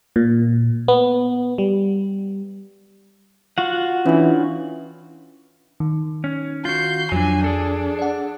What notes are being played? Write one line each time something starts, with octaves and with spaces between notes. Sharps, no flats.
A#2
B3
G3
F4 F#4 F#5
E3 C#4 D4
D#3
C#4
F4 F#4 G6 C7
F2 F3 F#3 D4 G#5
D4 G#4 A4
D5 F#5